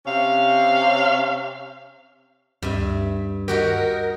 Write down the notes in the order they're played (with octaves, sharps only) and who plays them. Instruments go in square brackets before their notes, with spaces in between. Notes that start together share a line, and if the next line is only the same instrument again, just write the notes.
[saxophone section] C3 C#4 F5
[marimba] D2 [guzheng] G2 E5
[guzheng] D#4 F#4 G4 [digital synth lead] A#4